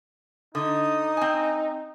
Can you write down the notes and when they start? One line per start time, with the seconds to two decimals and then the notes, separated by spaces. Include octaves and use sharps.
0.55 D3 D#4 D#6
1.17 C4 G#5